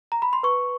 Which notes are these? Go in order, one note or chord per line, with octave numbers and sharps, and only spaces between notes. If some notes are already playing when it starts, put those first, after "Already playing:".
A#5
B5
C6
B4 C#6